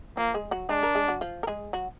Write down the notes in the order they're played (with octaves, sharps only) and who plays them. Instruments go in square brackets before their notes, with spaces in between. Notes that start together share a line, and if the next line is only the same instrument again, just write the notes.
[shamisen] F3 F4 [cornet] A#3
[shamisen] G#3 G#4
F#3 F#4
[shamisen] G#3 G#4 [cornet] D4
[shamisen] A#4
G#3 G#4
F#3 F#4
F3 F4
A#4
G#3 G#4
F#3 F#4